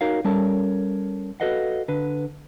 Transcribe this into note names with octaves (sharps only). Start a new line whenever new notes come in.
D#4 F#4 A#4 C#5 F5
G3 C#4 A4 A#4 C#5 A5
F#4 A4 B4 D#5 F5 F#5
D3 B4